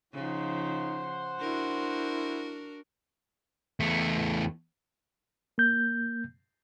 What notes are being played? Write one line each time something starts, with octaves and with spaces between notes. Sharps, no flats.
C#3 F3 D#4 C5 F#5
D4 E4 F#4 A#4
E2 A3
A#3 G6